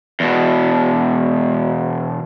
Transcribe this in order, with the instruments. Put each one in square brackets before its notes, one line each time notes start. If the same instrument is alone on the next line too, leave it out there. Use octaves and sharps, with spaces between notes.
[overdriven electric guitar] E2 B2